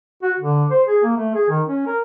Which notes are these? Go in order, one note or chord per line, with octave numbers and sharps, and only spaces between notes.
F#4
D3
C5
G#4
A#3
A3
G#4
D#3
C#4
A#4